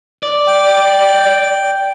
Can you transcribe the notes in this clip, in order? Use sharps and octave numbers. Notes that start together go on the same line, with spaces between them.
D5
G5